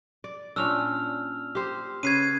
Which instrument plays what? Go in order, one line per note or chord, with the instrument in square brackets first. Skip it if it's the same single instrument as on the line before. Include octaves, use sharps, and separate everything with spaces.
[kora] D5
[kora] A#2 C#4 D4 [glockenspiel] E6 F6 F7
[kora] G4 C5
[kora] C#3 B4 [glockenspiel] G#6 C7 D#7